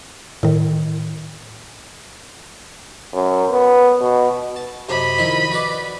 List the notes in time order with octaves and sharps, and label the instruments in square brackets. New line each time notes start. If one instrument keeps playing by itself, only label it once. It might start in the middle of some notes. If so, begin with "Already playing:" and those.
[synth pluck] A2 D#3
[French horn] F#2
B3
B2
[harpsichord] A5
[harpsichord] F#2 C3 [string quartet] D#5 B5
[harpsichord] D#3 F3 E4
F#4 B4 D5